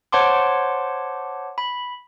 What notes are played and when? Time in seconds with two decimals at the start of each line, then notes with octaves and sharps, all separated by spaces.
0.12 C5 C#5 F#5 A5 C6 D6
1.58 B5